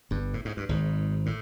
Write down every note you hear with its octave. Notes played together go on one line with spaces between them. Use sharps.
G1 G2
A2
G#2
G2
G#1 G#2
A2